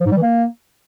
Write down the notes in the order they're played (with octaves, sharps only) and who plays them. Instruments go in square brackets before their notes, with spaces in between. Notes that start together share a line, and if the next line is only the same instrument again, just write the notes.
[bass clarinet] F3
G#2
G3
E3
A#3